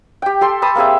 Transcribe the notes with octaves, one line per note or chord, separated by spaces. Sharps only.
G4 G5
G4 A4 C6
A5 B5 D#6
A#3 C4 G#4 E5